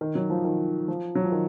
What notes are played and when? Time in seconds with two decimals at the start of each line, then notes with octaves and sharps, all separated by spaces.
0.01 D#3
0.15 F#3
0.30 F3
0.44 D#3
0.88 F3
1.15 F#3
1.24 F3
1.32 D#3